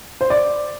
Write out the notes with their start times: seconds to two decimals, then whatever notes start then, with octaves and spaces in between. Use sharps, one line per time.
0.21 C5
0.30 D5